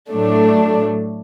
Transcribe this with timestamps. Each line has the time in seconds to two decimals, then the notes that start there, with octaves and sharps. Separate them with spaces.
0.11 A2 F#3 A3 D4